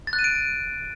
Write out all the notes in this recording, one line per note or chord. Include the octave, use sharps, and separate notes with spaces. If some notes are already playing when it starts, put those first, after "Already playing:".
A6
F#6
D#7
D7